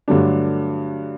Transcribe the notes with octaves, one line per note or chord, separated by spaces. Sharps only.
G2 D3 F#3 A3 D4